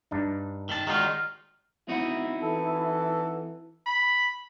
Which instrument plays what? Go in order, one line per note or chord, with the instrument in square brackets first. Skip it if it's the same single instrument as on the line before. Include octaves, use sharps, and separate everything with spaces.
[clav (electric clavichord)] G2 D4 D#4
[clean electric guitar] D#3 A5
[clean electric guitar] D#3 D#4 F4 [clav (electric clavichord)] G#3 F#4 D5
[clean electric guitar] C4 D#4 F#4 [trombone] E4
[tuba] E3 [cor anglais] A4
[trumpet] B5